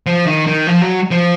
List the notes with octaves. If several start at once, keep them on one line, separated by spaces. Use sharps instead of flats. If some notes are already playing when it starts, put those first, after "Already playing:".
F3
D#3
D#3
F3
F#3
F3